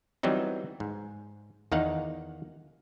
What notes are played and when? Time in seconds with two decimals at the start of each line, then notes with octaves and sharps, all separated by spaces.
0.23 E3 F#3 G3 B3 C4 D#4
0.80 G#2
1.72 E2 D#3 D#4 F5 F#5